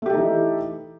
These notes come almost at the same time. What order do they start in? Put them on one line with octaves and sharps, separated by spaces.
A3 G4 A4 D#4 E3